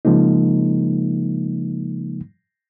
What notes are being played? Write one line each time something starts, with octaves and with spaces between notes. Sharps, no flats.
C#3 F3 G#3 A#3 D#4